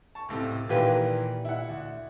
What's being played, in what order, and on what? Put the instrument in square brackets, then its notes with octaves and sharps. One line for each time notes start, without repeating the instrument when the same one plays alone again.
[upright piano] A5 C#6
C#2 A2 C3
[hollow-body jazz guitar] A#2 G4 B4 [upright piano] D#3 E3 A#3
[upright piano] E4 F#5
[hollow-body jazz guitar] D2